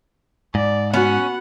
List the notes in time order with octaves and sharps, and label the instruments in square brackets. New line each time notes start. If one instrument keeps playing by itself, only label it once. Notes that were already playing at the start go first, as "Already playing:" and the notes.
[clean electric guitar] G#2 [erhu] D5
[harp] B3 F#4 [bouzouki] C#4 [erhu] F#5